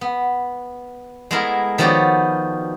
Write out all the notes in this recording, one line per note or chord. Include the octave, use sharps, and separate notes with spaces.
B3
G#3 A3 B3 E4 A#4
D#3 F3 B3 F#4 C#5 D5